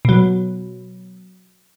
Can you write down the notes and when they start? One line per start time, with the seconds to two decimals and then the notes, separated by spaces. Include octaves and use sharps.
0.05 B2 F#3